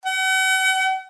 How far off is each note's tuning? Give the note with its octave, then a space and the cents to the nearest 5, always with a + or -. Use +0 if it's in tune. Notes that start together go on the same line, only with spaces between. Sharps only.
F#5 +40